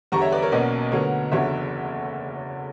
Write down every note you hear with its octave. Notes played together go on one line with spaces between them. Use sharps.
E2 D3 G3 A#5 C#6
C#5 E5
B4 D5
A#4 C#5
B1 B2 F#3 A#3 C#4 B4 D5
D2 D3 F#3 B3 A#4 C#5
F#1 E2 D3 F#3 C#5 E5